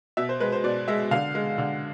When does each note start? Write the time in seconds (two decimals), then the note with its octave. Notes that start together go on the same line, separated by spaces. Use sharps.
0.17 B2 E5
0.29 C5
0.40 G#3 B4
0.52 C5
0.64 B2 D5
0.88 G#3 E5
1.11 D3 F5
1.35 G#3
1.58 D3